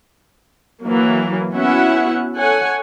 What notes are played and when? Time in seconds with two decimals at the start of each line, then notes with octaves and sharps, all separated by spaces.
0.84 E3 F#3 A#3
1.53 B3 C#4 E4 F#4 E5 F#5
2.37 A4 C#5 F#5 G#5